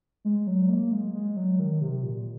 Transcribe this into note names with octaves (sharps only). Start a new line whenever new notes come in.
G#3
F#3
A#3
G#3
G#3
F#3
D#3
C3
A#2